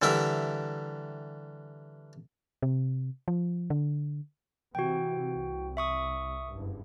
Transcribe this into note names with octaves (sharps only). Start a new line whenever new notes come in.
D3 E3 G3 A#4 E5 A#5
C3
F3
D3
C3 E3 F#4 G5
C2
E5 C#6 D#6
F#1 G2